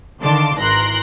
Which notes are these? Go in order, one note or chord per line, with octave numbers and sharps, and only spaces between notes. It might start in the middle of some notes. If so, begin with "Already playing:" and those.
D3 D#3 F5 A5 C6 D6
G#1 E3 A#4 C6 F#6 A#6